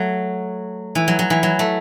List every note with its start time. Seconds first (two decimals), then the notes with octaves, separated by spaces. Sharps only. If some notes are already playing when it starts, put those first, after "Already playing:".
Already playing: F#3 A3
0.95 E3
1.08 F#3
1.19 F#3
1.30 E3
1.43 F#3
1.59 A3